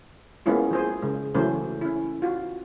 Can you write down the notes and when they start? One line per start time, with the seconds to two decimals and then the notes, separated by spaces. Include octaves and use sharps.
0.46 G#3 A#3 B3 C#4 E4 F4
0.71 F3 G#4 C5
1.02 C#3 G#3
1.34 C#3 E3 F#3 A3 C#4 C5
1.81 C#4 E4
2.22 F4 F#4